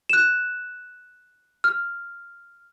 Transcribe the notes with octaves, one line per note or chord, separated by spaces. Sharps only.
F#6 E7
F6